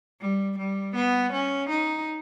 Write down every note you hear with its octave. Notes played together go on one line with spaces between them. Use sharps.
G3
G3
B3
C#4
D#4